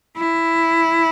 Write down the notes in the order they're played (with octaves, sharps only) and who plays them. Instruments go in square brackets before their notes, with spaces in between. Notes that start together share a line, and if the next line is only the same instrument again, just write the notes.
[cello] E4